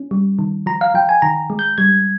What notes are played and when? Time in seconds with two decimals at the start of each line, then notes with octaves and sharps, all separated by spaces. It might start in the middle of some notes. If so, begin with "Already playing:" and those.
Already playing: C#4
0.11 G3
0.39 D#3
0.66 F3 A#5
0.81 F5
0.94 F3 G5
1.09 G#5
1.22 D#3 A#5
1.50 G#3
1.59 G6
1.78 G3 G#6